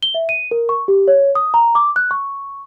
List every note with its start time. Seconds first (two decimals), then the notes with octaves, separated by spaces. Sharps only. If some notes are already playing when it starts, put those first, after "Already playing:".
0.03 G7
0.15 E5
0.29 D#7
0.51 A#4
0.69 C#6
0.88 G4
1.08 C#5
1.35 D#6
1.54 A#5
1.75 D6
1.96 F#6
2.11 C#6